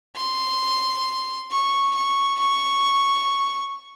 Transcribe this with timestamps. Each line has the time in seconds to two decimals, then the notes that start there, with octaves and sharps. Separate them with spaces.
0.16 C6
1.51 C#6
1.95 C#6
2.39 C#6